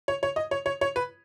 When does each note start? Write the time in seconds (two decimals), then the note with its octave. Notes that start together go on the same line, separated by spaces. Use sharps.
0.08 C#5
0.23 C#5
0.36 D#5
0.51 C#5
0.66 C#5
0.81 C#5
0.96 B4